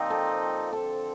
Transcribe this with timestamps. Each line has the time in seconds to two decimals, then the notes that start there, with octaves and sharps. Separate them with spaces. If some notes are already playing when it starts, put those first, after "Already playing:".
Already playing: A#2 F3 C4 D#4 G4
0.10 A4
0.73 D3 F3 C4 A4